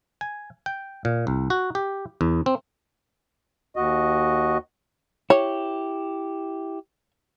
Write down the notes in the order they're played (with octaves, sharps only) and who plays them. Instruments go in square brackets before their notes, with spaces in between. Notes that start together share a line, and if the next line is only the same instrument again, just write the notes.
[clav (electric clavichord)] G#5
G5
A#2
C2
F#4
G4
E2
C4
[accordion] D#2 F#4 D#5
[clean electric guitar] E4 G4 [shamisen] C#5